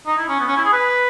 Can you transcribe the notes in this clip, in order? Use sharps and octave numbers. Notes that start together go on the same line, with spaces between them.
D#4
E4
C#4
B3
C#4
E4
G#4
B4